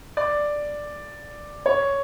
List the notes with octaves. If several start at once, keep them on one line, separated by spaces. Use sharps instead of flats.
D5
C#5